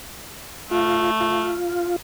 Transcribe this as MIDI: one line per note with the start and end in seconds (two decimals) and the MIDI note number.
0.71 1.55 57
0.71 1.11 65
1.21 1.96 65